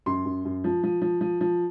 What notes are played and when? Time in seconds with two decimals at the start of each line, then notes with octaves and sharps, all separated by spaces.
0.06 F#2 C6
0.25 F#2
0.45 F#2
0.64 F3
0.83 F3
1.02 F3
1.21 F3
1.41 F3